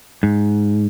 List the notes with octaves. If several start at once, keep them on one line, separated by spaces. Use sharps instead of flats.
G#2